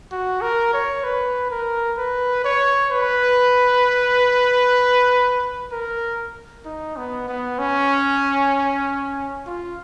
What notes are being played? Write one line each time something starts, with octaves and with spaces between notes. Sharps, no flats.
F#4
A#4
C#5
B4
A#4
B4
C#5
B4
A#4
D#4
B3
B3
C#4
F4